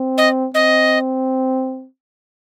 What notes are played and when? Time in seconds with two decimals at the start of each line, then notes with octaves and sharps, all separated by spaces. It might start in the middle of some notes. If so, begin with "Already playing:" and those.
Already playing: C4
0.18 D#5
0.54 C4 D#5